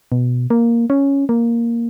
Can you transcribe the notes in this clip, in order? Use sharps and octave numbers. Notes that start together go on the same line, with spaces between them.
B2
A#3
C#4
A#3